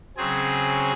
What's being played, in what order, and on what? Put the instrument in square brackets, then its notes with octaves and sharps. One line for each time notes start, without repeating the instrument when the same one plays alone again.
[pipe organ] C#3 F#3 C4 G#4